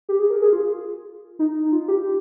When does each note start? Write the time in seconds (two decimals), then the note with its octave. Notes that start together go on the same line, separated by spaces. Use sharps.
0.09 G4
0.19 G#4
0.30 A#4
0.42 G#4
0.53 F4
1.39 D#4
1.72 F4
1.88 G4